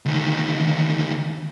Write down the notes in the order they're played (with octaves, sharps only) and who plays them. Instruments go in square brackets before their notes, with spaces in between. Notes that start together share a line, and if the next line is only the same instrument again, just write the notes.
[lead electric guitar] D2 D#3